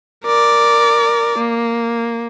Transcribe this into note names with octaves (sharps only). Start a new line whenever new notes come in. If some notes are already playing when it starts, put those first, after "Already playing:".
A#4 D5
A#3